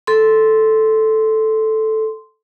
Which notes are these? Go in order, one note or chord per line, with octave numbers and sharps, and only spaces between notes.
A4 C6